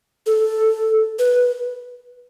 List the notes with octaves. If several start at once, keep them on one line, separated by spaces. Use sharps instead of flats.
A4
B4